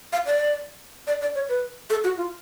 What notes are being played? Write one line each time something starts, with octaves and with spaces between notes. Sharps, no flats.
F5
D5
D5
D5
C#5
B4
A4
F#4
F4